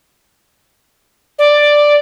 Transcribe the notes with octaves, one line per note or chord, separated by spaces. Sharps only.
D5